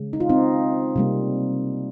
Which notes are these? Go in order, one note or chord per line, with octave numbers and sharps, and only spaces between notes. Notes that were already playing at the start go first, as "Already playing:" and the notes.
Already playing: C#3 G#3
D#4
F4
C4 D#4
C3 G3 A#3